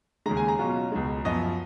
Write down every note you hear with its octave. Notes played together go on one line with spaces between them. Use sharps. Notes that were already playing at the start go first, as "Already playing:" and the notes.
D#2 C#3 G#3 A#5
G#5
A#5
B2 F#3 C#4 F4
C#2 B2 G#3
F#2 F3 B3 D#5